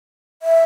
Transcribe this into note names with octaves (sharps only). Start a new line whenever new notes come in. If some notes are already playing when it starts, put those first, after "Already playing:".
E5